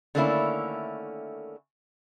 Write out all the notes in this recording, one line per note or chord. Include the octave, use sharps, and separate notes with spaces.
D3 D#3 A3 A#3 C#4 E4